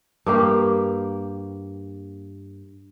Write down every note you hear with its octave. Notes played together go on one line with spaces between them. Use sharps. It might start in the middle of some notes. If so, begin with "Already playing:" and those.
G2 A#3 G4